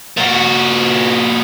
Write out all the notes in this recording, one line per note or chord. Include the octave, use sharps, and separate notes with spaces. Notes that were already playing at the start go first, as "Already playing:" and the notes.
A#2 F#4